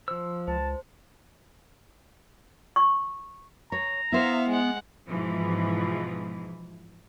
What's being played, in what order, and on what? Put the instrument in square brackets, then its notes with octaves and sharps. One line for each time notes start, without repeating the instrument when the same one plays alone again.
[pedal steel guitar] F3 E6 [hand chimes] C5
[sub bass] C#2 [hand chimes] C5 [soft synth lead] A5
[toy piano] C#6
[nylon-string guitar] C#5 [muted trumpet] A#5
[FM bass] B3 [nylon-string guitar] E4 C5 [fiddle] E5 F5
[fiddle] G#3 F#5
[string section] G#2 B2 E3 F3